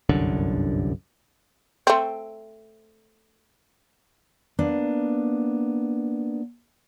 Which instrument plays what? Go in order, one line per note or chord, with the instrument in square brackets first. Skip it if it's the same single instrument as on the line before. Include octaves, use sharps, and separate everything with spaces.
[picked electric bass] G1 C2 F#2 D3
[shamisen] A3 C4
[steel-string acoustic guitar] A#3 B3 D4